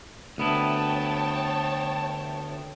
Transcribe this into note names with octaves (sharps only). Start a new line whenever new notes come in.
D2 B3 E4 C#5 G5 A5